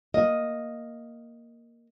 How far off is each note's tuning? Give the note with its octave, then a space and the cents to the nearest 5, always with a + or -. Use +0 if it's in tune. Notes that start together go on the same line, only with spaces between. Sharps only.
A#3 +0 D#5 +0